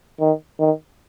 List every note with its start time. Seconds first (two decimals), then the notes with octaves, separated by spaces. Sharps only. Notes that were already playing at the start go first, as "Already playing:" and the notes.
0.20 D#3
0.59 D#3